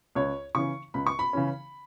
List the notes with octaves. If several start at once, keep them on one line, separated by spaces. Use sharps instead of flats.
C#2 C#5
C#3 E3 C#4 C#6
C#2 B5
C#6
B5
C#3 E3 C#4